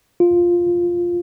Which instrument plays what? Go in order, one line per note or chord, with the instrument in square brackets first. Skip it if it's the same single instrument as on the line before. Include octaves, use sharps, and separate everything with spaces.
[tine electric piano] F4